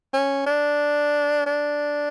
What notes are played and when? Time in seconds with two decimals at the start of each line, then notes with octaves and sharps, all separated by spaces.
0.14 C#4
0.46 D4
1.46 D4